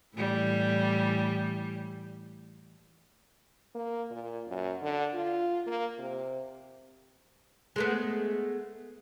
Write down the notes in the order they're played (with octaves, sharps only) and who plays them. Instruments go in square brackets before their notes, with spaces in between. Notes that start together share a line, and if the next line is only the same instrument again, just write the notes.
[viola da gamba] A2 E3 G3
[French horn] A#3
A#2
F#2
D3
F4
A#3
C3
[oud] G#3 A3 B3